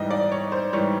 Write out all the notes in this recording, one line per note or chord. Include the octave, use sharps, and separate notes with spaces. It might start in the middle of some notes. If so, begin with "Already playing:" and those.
Already playing: G#2 E3 G3 D#5
D5
C#5
C5
G#2 E3 G3 C#5